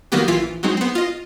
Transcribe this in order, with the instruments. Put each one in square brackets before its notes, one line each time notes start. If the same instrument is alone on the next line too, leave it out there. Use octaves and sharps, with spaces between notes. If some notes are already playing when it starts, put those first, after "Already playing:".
[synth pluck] D#3 F#3 A#3 B3 G4
A#1 E3 E4 F4 F6 B6
F#3 G#3 C4 D#4
B3 C4
F4 D#5